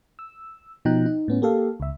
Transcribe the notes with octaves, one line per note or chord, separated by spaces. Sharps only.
E6
B2 F3 D#4 G5 A#5 F#6
D#4
A2 B3 C#4
A#3 G4 A4 F5
C#2 E5